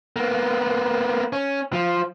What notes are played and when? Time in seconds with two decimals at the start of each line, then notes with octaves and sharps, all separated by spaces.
0.16 A#3 B3
1.33 C#4
1.73 F3